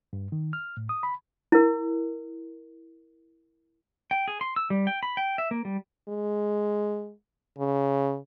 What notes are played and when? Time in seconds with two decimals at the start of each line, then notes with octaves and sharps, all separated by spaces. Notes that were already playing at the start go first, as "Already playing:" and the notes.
0.13 G2
0.32 D#3
0.53 F6
0.77 A2
0.89 D#6
1.03 B5
1.52 E4 A#4
4.11 G5
4.28 G#4
4.41 C6
4.56 E6
4.70 G3
4.87 G5
5.03 B5
5.17 G5
5.38 E5
5.51 A#3
5.65 G3
6.09 G#3
7.58 C#3